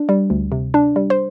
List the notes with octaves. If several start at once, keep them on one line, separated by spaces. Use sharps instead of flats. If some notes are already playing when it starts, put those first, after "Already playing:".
Already playing: D4
G3
D2
C3
D4
G3
C5